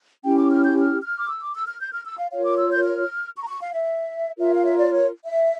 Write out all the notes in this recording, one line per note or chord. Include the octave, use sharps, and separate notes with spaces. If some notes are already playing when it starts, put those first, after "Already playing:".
C#4 E4 G4 G5
D6
F6
G6
F6
F6
D6
E6
D6
E6
F6
G6
F6
E6
F5
F4 A#4 C#5 F5
D6
E6
G6
F6
C#6
A#5
C#6
F5
E5
F4 A#4 C#5 E5
F5
E5
D5
C#5
E5